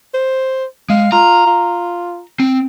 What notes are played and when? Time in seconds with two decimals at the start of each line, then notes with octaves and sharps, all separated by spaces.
0.14 C5
0.90 G#3 F5
1.12 F4 A#5
1.47 F4
2.40 C4